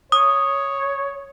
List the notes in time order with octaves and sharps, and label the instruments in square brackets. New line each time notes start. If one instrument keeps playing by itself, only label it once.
[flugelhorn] C#5 [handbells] D#6